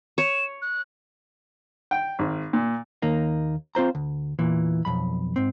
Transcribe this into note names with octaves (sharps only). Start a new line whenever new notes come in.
C#5 E7
F#6
G5
G#1
A#2
D#2 A#3 D#4
C4 F4 C5 A#5
D2
E2 A#2 E3
B1 F2 B5
G#2 C4